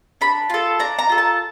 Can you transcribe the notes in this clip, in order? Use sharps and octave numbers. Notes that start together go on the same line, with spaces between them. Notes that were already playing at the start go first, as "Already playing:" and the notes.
D4 B5
F4 A4
D4 A#5
A#5
F4 A4
A5